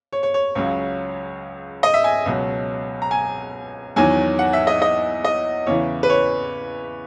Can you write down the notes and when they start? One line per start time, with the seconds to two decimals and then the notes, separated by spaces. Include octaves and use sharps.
0.13 C#5
0.23 C#5
0.34 C#5
0.55 C#2 C#3 F#3 C#5
1.83 D#5
1.94 E5
2.04 G#5
2.26 C#2 B2 F#3
3.02 A#5
3.11 G#5
3.96 E2 D#3 F#3 G#5
4.39 F#5
4.53 E5
4.67 D#5
4.82 D#5
5.24 D#5
5.67 E2 C#3 E3 C#5
6.03 B4
6.10 C#5